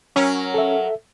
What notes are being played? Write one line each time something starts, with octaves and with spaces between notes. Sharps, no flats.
F#3 C#4 A#4
A4 E5